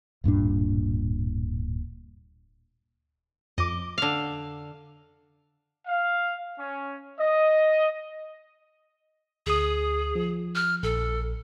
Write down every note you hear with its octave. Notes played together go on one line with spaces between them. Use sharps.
D1 G2 A#2 D4
F2 D#5 D6
D3 F5
F5
C#4
D#5
D2 G#4 D#6
F3
F6
A#1 A4